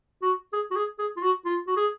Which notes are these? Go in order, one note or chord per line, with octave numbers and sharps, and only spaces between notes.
F#4
G#4
F#4
G#4
G#4
F4
F#4
F4
F#4
G#4